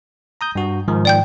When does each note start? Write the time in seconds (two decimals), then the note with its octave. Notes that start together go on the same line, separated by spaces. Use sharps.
0.41 A#5 D#6 G6
0.55 G2 F#4
0.88 G#2 D#3 F3
1.05 D5 G5 G6